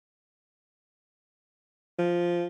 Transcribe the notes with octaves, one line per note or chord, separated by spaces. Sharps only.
F3